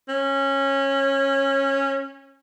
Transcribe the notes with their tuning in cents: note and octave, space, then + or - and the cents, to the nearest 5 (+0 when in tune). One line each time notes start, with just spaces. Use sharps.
C#4 -20